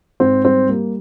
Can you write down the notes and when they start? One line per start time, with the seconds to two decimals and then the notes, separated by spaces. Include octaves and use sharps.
0.20 G#2 C4
0.45 G3 C4
0.69 G3 A#3